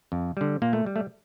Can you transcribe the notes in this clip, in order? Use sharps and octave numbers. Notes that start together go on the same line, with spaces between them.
F2
D3 G3
A#2 A#3
A3
G3
A3